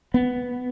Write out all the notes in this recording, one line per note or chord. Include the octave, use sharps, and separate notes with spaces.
B3